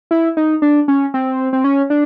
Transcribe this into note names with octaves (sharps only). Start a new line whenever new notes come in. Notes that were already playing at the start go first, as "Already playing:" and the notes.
E4
D#4
D4
C#4
C4
C4
C#4
D4